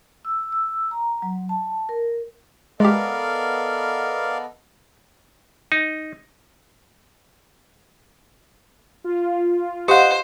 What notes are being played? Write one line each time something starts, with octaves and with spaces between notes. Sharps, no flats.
E6
E6
A#5
F#3
A5
A#4
G#3 B3 G4 A4 A#4 D5 D#5 F5
D#4
F4
G4 C5 D#5 F5 F#5